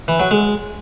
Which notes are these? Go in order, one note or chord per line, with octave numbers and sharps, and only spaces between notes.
E3
F#3
G#3